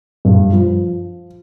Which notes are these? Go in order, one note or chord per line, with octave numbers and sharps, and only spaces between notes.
G2
F3